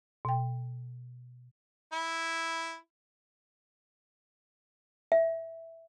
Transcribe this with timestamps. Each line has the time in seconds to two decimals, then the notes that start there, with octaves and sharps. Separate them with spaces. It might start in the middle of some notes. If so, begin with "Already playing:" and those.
0.25 B2 G5
1.92 E4
5.12 E5